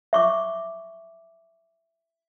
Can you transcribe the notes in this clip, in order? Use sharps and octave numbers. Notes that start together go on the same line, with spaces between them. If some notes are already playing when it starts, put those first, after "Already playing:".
E5 C#6 D6